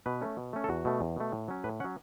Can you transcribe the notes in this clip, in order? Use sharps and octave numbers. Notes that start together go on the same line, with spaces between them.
B2 B4
A3 C#4
B2
A3 C#4
A4
E2 F#4
B2 A3
E2
B2 A3
A2
F#3 C#4
A2 B4
F#3 C#4 F#5